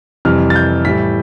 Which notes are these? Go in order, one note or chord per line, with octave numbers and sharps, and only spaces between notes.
F2 C3 E3 G3 F6
A6
G6
A2 E3 G3 B6